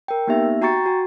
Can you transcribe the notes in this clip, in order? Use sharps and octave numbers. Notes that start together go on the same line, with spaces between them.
A#4 G5
A#3 B3 D#4 G4 E5
F#4 G5 A#5 C#6 A6 C#7
F#4 G#5